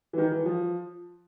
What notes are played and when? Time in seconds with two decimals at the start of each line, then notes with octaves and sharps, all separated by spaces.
0.13 E3
0.18 D#3
0.31 E3
0.46 F3